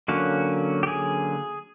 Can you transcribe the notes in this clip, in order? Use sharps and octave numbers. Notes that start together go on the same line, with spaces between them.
D3 F#3 A#3 C#4 F#4
G4
G#4